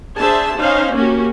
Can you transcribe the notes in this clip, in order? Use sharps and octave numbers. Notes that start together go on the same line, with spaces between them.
D4 G#4 C5 E5 A5
C#4 D#4 C5 F5
A#3 C#4 F#4 G4